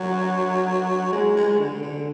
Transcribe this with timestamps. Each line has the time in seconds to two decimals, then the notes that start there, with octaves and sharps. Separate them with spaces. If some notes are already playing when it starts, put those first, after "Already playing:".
Already playing: F#3
1.12 G#3
1.36 G#3
1.59 D3
1.82 D3